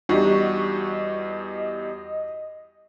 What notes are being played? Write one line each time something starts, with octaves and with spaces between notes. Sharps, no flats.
E2 G3 D4 D#4 F#4 G4 D#5